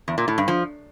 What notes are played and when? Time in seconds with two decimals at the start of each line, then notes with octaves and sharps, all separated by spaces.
0.08 E2
0.18 A#2
0.28 A2
0.38 G2
0.48 F3